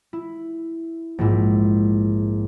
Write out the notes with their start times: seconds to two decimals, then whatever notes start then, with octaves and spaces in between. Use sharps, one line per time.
0.13 E4
1.18 A#1 G#2 E4